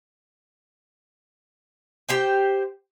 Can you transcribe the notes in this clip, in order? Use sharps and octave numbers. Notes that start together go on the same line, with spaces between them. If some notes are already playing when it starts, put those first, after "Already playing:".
G4 C5 G5